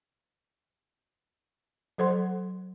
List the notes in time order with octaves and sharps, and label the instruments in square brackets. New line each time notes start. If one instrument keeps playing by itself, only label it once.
[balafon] F#3 A4 C5 F#5 C6